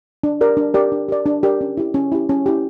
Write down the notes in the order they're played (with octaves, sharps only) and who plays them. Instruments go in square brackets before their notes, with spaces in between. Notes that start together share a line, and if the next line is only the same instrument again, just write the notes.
[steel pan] D4
G4 A#4 D5
D4
G4 A#4 D5
D4
G4 A#4 D5
D4
G4 A#4 D5
C#4
E4 G4
C#4
E4 G4
C#4
E4 G4